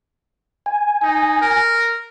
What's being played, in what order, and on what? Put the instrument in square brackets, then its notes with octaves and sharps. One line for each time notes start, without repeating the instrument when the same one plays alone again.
[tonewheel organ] G#5
[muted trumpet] D#4
A#4